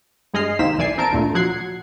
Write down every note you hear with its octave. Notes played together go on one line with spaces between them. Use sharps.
G2 G#3 G#4 D#5 F6 C7
C2 D#3 A#3 C4 B6 E7
B1 E3 D5 G#5 C7
C4 A#4 A5 D7
D2 A#2 D3 A3
F3 F#3 F#5 G#6 C7